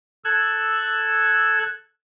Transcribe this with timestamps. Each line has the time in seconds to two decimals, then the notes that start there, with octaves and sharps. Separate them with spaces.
0.24 A4 E6 F#6 G#6